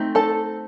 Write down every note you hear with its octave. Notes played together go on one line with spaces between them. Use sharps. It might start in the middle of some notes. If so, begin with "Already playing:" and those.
Already playing: A3 C4 D#4
A4 A5